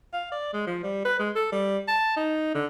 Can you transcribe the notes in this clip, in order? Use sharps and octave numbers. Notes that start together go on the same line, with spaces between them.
F5
D5
G#3
F3
G3
B4
G#3
A4
G3
A5
D#4
D3